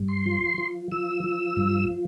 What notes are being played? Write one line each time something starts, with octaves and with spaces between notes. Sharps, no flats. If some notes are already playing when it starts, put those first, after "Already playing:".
Already playing: G2
C6
F3
F3
F3 E6
F3
G2